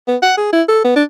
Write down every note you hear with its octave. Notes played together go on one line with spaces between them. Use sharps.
B3
F#5
G#4
E4
A4
B3
D4